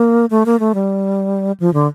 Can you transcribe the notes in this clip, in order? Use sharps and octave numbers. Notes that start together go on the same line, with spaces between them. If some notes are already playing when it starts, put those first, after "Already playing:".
Already playing: A#3
A3
A#3
A3
G3
F3
D3